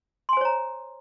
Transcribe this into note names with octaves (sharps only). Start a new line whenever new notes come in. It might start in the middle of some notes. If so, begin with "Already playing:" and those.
C5 C#5 G#5 A#5 C6